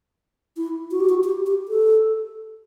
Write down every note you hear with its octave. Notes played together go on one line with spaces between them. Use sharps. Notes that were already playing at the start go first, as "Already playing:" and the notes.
E4
F#4
G4
F#4
G4
G4
A4